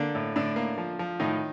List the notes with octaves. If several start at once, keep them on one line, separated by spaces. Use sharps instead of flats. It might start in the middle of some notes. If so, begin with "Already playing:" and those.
Already playing: D3 A#3 D4
A2
A2 D3 D4
A#3
F3
F3
A2 D#3 D#4